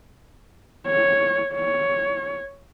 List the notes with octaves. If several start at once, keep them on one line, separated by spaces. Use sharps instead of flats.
C#5
C#5